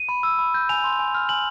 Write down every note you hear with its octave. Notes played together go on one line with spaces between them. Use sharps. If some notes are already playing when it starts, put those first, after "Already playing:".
Already playing: D#7
B5
E6
B5
G6
G#5 F7
C6
G#5
F6
G#5 F#7